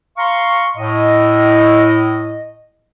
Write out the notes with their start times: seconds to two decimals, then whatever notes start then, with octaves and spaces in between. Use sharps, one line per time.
0.18 F5 A#5 C6 C#6
0.77 A2 D#5